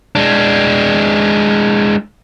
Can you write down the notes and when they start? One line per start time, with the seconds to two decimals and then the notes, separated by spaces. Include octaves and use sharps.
0.15 G#3 D4